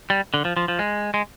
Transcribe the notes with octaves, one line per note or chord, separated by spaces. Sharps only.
G3
D3
F3
F3
F3
G#3
G#3